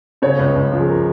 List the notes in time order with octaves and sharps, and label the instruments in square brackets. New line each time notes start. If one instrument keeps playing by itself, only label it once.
[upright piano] C#3 C#5
C#2
C#2
F3
G#4
A#4